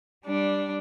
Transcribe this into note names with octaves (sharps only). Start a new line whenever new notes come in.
G3 D4